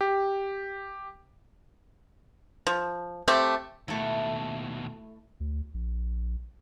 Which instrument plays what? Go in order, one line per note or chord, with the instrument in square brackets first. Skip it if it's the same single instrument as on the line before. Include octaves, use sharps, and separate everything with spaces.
[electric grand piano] G4
[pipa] F3
A3 C4 G4 E5
[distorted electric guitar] D#2 B2 [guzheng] A3 E4
[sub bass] D2
A#1